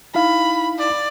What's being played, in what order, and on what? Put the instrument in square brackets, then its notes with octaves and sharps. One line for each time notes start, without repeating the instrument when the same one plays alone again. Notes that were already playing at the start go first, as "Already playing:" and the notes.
[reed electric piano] D#4 E4 F5 [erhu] B5
[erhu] D5